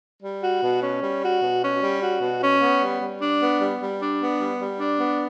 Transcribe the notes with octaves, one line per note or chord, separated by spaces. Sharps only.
G3
F#4
B2
C#4
G3
F#4
B2
C#4
G3
F#4
B2
C#4
B3
G3
G3
D4
B3
G3
G3
D4
B3
G3
G3
D4
B3